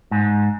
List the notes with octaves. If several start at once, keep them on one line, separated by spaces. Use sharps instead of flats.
G#2